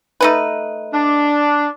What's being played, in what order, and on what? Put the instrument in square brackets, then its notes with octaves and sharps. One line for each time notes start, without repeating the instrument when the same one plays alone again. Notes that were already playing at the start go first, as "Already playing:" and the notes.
[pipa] A3 D#4 B4
[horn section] D4